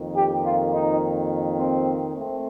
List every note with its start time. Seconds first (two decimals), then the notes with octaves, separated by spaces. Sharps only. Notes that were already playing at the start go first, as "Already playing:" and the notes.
Already playing: F2 D#3 A#3
0.15 G4
0.44 F4
0.72 D#4
1.58 C4
2.15 A3 C4